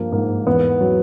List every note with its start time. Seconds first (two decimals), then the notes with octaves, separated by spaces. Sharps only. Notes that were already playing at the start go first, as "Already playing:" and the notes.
Already playing: G2 F3 A#3
0.12 G#2 A#3
0.46 E2 B3
0.81 F#3